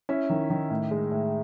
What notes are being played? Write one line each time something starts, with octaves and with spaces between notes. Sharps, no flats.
C#4 E4 E5
D#3
D#3
A2
G#3
A2